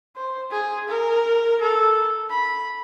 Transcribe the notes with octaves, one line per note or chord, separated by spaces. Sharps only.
C5
G#4
A#4
A4
B5